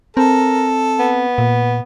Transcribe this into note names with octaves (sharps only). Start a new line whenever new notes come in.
C4 A4 A#4
B3
A#2